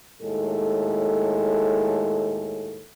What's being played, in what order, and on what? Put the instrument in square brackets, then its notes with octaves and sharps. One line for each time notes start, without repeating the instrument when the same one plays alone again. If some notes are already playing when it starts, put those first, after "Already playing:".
[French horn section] D#2 A2 G#3 A4